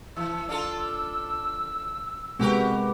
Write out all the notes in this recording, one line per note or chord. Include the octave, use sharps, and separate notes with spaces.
E3 E6
D4 F4 A4
C3 G#3 B3 F#4 G4 A#4